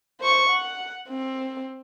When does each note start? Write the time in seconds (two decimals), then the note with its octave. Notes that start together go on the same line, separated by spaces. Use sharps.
0.20 C5 C#6
0.50 F#5
1.10 C4